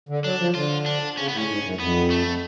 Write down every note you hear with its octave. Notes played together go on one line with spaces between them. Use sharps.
D3
F#3 D4
F3
D3 F4
D4
C#3 C#4
A2 B3
C#4
G#2
F#2
F2 B3
A3